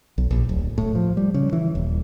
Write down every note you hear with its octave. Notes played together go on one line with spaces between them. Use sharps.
B1
A#1
D1
A2
F3
G3
C#3
E3
D#1